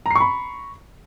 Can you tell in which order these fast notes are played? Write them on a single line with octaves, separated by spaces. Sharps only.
A#5 C7 C#6 B5